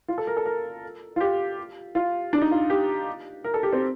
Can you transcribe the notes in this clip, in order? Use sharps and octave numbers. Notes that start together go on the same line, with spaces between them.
F4
A4
A#4
A4
A#4
F4
G4
F4
D4
D#4
F4
G4
A#4
A4
G4
C4